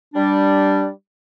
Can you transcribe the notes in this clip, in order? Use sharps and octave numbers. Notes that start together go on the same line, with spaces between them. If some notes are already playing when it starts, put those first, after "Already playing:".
G3 D4